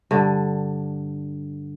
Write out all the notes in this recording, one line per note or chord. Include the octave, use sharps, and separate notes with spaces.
G2 D3